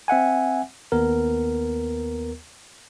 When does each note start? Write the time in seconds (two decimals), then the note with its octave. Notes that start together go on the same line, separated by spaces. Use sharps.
0.08 C4 E5 F#5 G#5
0.92 D#2 B3 A#4